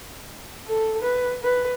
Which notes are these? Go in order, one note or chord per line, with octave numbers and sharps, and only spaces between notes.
A4
B4
B4